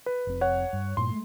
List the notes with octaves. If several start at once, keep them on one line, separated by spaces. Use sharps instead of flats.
B4
F1 C4
C#5 F#5
G2
G2 A#2 C6
G#3 A3